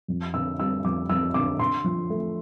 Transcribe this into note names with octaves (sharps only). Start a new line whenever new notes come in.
F2
D3 E6
G3 E6
F2 D6
F2 E6
D3 D6
D3 C6
F3
A3